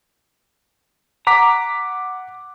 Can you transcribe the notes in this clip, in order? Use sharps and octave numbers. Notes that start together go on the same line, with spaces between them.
F#5 A#5 D6 B6